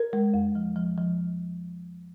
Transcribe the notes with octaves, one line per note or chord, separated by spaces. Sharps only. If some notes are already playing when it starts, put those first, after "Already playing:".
Already playing: A#4
G#3
F2
F3
F3
F3